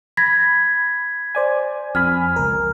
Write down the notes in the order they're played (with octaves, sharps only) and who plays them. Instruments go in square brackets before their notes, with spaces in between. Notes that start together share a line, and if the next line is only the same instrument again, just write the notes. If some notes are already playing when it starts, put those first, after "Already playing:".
[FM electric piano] B5 [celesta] G#6 A#6 B6
[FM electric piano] C5 D5 G#5
[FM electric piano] F2 G#5 B5 [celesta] F6
[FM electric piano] C#2 A#4